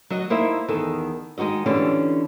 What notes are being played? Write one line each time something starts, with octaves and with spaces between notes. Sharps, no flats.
F#3 F#4 D#5
A#3 D#4 E4 A#4 C5 E5
E2 D#3 A4
D#3 G#3 D#4 F#4 D#5
D3 E3 C#4 D4 F4 G4